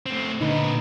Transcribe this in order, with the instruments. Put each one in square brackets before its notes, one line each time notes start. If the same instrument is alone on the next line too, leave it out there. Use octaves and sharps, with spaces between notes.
[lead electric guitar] A3 C4
[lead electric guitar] A#2 B4 [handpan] D3 D#4